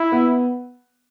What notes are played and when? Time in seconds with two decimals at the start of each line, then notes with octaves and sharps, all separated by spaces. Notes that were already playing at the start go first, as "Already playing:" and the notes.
Already playing: E4
0.12 B3